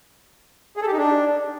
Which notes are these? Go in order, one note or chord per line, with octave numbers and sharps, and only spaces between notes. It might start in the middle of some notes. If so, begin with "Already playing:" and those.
G#4
A4
G4
D#4
D4